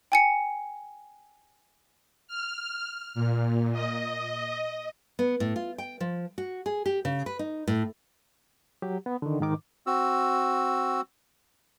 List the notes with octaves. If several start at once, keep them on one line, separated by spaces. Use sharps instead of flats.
G5 G#5 C#7
F6
A#2
D#5
B3
A2
F4
G5
F3
F#4
G#4
G4
C#3
B4
D#4
A2
F#3 G4
B3
D3 D#3
G#2 D#3 D6
C4 F#4 E6